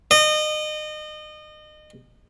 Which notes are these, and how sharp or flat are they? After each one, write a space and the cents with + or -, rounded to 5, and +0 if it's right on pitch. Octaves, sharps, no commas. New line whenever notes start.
D#5 -30